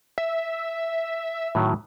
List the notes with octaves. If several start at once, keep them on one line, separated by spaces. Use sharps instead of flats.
E5
A2 D#3 F#3